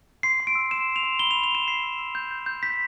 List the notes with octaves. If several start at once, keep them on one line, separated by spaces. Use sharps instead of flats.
C6 C7
C6
D7
E6
C6 E7
E6
F7
C6
B5 G7
F7
B5
F7
B5 E7
B5 C7
E6
E6
G6
G6
G6
G6 B6